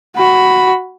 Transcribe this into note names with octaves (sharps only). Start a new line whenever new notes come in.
F#4 B5